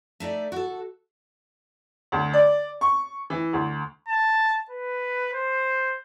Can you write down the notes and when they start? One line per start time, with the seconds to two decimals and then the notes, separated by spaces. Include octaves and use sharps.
0.20 A3 D#4 D5 E5
0.52 F#4 A4
2.12 D2
2.33 D5
2.81 C#6
3.30 E3
3.53 D2
4.08 A5
4.70 B4
5.33 C5